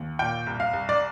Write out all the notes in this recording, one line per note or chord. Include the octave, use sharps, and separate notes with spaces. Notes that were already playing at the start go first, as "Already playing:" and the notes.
Already playing: D#2
A#2 G5
C2
F5
C2
D5